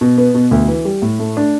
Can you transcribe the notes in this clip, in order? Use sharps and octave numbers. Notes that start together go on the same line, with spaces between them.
B2
B3
B2
D2
E3
G3
A2
A3
D4